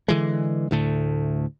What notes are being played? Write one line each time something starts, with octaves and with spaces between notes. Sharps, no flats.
D3 E3 G#3
D2 A2 D3 A3